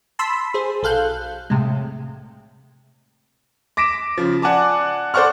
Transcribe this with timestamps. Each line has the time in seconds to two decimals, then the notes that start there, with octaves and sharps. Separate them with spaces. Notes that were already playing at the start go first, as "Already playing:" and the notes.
0.19 A5 B5 C6 E6 B6
0.54 G#4 C5
0.83 B1 A4 F5 F#6 G6
1.50 A2 C3 G#3
3.77 D6 A#6 B6 D7 E7
4.18 C#3 F3
4.42 D5 F#5 G#5 A5 D6
5.14 A4 C5 D5 F#5 C#6 F6